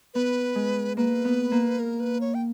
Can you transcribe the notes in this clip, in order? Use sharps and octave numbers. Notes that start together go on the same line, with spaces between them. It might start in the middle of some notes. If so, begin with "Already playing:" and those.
B3 B4
G#3
A#3 B4
B3
A#3
A#4
B4
C#5
G5